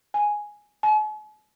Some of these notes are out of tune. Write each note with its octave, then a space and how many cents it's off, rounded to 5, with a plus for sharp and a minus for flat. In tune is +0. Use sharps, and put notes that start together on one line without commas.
G#5 +0
G#5 +45